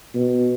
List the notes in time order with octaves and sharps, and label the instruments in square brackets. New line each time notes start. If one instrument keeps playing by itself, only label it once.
[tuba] B2